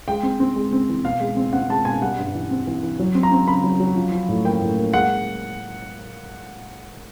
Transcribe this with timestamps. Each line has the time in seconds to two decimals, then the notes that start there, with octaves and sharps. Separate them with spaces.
0.08 G#3 G5
0.23 C4
0.40 C4
0.56 G#3
0.73 C4
0.89 E3
1.05 B2 F5
1.20 G#3
1.37 C4
1.53 C4 F#5
1.69 G#3 A5
1.85 B2 G#5
2.02 G3 F#5
2.18 G2
2.35 E3
2.51 C4
2.67 E3
2.83 E3
3.00 F#3
3.15 C4
3.23 A#5
3.32 C4
3.48 C#3 B5
3.64 F#3
3.80 F#3
3.95 F3
4.12 F3
4.29 A2
4.45 A#3 G5
4.61 A2
4.77 A#3
4.93 G#3 F#5